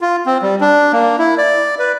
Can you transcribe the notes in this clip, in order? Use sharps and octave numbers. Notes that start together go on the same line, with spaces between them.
F4
C4
G3
D4
A#3
E4
D5
B4